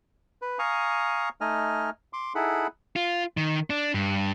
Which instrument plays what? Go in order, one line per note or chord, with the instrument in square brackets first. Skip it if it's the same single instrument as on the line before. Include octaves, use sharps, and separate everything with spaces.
[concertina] B4
F5 G#5 A#5 C#6 D#6
A3 D#4 D#5 G#5 F6
C6 D6
D#4 E4 G#4 A4 F#5 B5
[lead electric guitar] F4
D#3
D4
G2